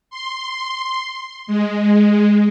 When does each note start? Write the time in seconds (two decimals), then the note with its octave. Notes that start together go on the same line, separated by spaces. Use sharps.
0.10 C6
1.47 G#3